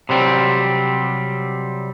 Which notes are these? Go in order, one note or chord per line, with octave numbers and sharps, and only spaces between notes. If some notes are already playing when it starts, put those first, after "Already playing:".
C3 F#3 G3 C4